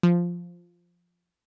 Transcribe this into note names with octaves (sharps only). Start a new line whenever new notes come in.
F3